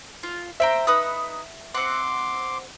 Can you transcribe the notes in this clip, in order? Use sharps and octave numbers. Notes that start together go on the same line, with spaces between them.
F4
C5 E5 G5 A#5
D#4 B4 D#6
C4 F#5 C6 D6